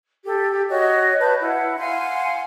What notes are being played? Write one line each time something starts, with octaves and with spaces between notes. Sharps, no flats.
G4 A4
G4
F#4 C#5 D#5
B4 A5 G6
E4 F#5
F5 F#5 G#5 C6